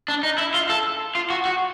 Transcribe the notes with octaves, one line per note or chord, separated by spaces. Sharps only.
D4
D#4
E4
F4
A4
F4
F#4
F#4